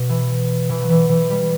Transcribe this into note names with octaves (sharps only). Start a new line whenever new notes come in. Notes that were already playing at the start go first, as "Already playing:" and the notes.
Already playing: B2
E3
E3
F#3
E3
E3
G3